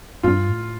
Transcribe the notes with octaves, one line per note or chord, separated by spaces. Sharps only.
G2 F4
A2